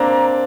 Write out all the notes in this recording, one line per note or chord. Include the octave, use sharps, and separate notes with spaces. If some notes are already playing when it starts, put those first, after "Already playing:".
Already playing: A#3 C4 D4 A#5